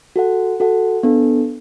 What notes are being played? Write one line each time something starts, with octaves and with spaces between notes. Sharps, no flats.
F#4 A4 F#5
F#4 A4 F#5
B3 D4 A4